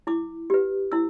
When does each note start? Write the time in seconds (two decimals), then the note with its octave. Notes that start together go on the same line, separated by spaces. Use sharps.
0.07 E4 D6
0.50 G4 B4
0.92 E4 E6